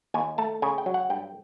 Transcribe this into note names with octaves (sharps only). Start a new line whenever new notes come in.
D#2 G#5
A3 A5
C#3 G#5
G5
F#3
F#5
G2 G5